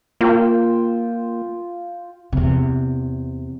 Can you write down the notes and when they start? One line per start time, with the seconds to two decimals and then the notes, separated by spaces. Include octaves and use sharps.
0.21 A#3 F4 G5 E6
2.32 E2 C3